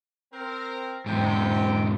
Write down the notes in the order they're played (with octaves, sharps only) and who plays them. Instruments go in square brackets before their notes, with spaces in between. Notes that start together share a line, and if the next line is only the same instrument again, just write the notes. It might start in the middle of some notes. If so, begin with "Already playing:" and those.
[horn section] C4 A#4
[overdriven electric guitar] E2 G#2 [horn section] C3 G5